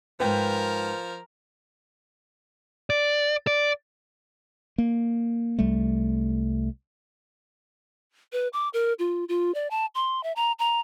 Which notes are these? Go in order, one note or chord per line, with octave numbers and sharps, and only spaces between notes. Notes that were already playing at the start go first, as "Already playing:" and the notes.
F2 G#2 F3 A#4 B4 G5
D5
D5
A#3
C2 G3 A3
B4
D6
A#4
F4
F4
D5
A5
C6
E5
A#5
A#5